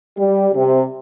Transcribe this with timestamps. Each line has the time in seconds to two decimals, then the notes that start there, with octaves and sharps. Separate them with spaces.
0.17 G3
0.54 C3